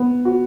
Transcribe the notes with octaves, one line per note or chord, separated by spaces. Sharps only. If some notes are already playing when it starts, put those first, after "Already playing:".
Already playing: B3
F#4